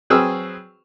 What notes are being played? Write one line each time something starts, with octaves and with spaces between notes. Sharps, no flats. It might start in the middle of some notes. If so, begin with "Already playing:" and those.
F#3 C4 G#4 B4 E6 F6